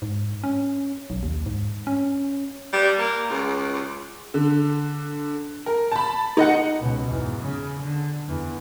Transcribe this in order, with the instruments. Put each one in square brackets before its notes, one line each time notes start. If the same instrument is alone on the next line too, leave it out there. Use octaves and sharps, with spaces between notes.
[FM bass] G#2
C#4
B1
D#2
G#2
C#4
[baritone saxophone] G3
A#3
C#2
[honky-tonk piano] D3
A#4
A5 B5
D#4 D#5 F#5
[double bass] C#2 B2
E2 G#2
C#3
D3
E2